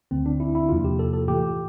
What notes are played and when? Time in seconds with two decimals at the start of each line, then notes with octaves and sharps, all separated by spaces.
0.11 D2 D3 A3 C4
0.26 D4
0.40 E4
0.55 E4
0.69 E2 C3 F3 A#3 F4
0.84 G4
0.99 A4
1.13 A4
1.28 A2 E3 A3 G4